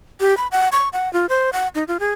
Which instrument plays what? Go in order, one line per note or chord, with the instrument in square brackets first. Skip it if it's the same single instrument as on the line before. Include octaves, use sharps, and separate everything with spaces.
[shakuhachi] G4
B5
F#5
C#6
F#5
F4
C5
F#5
D#4
F4
G#4